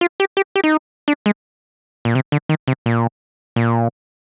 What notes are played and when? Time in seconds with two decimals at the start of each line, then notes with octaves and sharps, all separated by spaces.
0.01 F4
0.20 G4
0.37 G4
0.56 G4
0.64 D#4
1.08 D4
1.26 G#3
2.05 A#2
2.15 C3
2.32 D3
2.49 D#3
2.68 C3
2.86 A#2
3.56 A#2